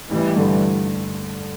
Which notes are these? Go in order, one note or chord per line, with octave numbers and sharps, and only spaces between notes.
A1 E3 G3
G2 D3